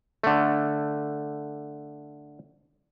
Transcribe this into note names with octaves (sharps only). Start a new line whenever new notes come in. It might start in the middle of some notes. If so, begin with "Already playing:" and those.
D3 A3